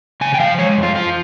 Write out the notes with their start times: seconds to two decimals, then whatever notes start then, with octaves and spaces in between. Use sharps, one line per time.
0.21 C#3 G#5
0.34 G5
0.39 F3 F5
0.58 G#3 C#5
0.77 F2
0.83 F4
0.95 F3 F4